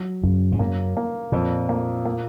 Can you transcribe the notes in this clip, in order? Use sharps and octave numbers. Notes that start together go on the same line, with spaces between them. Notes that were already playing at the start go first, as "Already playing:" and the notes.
Already playing: F#3
F#2 C#3
G#2
F#2 A#3
A#3
F2 A#2
A#3
A#3